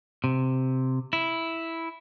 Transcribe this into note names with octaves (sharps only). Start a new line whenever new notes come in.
C3
E4